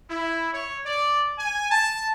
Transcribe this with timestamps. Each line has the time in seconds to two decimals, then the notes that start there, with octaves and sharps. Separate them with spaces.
0.10 E4
0.54 C#5
0.86 D5
1.38 G#5
1.71 A5